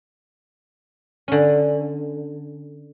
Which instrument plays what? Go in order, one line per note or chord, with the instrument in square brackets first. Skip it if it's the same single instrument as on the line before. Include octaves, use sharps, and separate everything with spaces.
[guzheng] D3 C#4